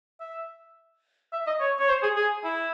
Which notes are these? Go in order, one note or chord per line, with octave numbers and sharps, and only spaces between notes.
E5
E5
D#5
C#5
C#5
C5
G#4
G#4
E4